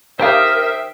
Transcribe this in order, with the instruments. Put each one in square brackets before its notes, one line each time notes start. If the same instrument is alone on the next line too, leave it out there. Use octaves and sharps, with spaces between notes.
[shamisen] D#3 G4 F5 [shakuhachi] A#4 [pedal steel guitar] C5 G5 D#6 [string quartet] E5